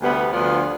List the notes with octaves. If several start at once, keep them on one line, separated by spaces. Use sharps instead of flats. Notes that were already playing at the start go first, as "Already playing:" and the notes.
D2 C3 G3 B3
D2 D3 F3 B3 F4